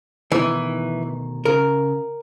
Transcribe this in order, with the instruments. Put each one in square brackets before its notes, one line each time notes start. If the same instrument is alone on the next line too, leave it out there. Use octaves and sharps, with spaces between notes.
[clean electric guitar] D2 B2 D#3 [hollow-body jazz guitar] E3
[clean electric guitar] C#3 [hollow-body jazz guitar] A#4